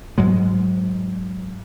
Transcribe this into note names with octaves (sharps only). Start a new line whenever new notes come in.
G#2 F#3 G#3